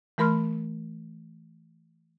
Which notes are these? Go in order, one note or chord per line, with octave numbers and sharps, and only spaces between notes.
E3 A3 A#4 B5 C6 F6